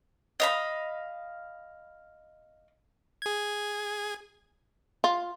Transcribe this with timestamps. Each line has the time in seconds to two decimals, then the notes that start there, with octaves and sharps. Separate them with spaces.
0.40 D#5 F5 B5
3.22 G#4 G#6
5.04 F4